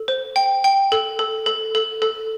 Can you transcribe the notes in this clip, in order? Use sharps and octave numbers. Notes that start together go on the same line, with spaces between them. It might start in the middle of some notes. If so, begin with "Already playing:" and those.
Already playing: A4
C5
G5
G5
A4
A4
A4
A4
A4